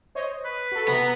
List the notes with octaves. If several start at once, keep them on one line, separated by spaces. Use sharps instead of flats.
C5 C#5 D#5
B4
F#4 A4
C3 B3 A#5